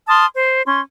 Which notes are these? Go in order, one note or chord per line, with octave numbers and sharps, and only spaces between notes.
A5 C6 D#6 F6
C5
C#4 C6